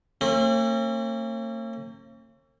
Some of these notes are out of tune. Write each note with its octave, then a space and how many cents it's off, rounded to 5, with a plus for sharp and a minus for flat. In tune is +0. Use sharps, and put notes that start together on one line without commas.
A#3 -45 C#4 -45